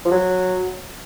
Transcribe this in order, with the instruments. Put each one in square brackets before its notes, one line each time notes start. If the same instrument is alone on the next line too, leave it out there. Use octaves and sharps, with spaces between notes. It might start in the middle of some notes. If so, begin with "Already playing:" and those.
[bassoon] F3
F#3